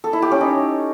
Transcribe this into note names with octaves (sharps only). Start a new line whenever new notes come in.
A4
E4
G4
C#4
D#4